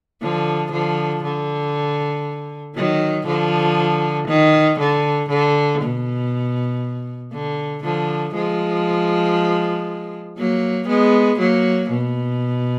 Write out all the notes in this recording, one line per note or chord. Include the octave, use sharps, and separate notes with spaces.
D3 F3
D3 F3
D3
D#3 F#3
D3 F3
D#3
D3
D3
B2
D3
D3 F3
F3 G#3
F#3 A#3
G#3 B3
F#3 A#3
B2